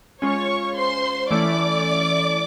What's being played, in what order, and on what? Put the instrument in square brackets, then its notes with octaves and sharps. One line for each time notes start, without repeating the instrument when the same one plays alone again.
[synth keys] G#3 C#4 F4 [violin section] C#5 C#6
[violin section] C5 C6
[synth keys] E3 A3 C#4 E4 [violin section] D5 D6